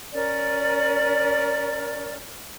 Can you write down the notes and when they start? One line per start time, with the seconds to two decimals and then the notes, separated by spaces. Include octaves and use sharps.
0.13 C#4 A#4 D5